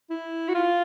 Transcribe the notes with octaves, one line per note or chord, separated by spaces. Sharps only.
E4
F#4
F4